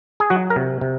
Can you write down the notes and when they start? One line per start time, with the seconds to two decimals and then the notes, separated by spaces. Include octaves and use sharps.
0.20 G#4
0.30 F#3 F#4
0.50 A#4
0.56 C3
0.81 C3